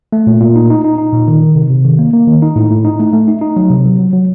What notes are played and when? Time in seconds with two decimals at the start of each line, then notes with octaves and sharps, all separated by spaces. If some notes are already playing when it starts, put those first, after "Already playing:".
0.13 A3
0.27 A#2
0.41 A#2
0.56 D#4
0.70 D#4
0.84 D#4
0.98 D#4
1.13 A#2
1.28 D#3
1.42 D#3
1.55 C3
1.70 C3
1.85 D#3
1.99 A#3
2.14 A#3
2.27 D#3
2.42 D#4
2.56 A2
2.71 A2
2.85 D#4
3.00 A3
3.13 A3
3.28 D#4
3.41 D#4
3.56 F#3
3.70 C3
3.86 F#3
3.99 F#3
4.13 F#3